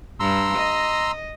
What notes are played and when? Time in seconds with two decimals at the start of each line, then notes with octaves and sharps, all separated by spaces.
0.20 G2 A#5 C6 E6
0.57 D#5